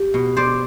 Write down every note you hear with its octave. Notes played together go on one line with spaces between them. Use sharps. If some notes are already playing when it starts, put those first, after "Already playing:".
Already playing: G4
B2
C5 D5